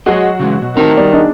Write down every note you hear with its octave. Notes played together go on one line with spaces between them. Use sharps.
F#3 F#4 G#4 D#5
C#3 E3 G#3
B2
A2 D#3 C4 G4 A5 A#5
G3 B3 D5
D4 D#4 G#4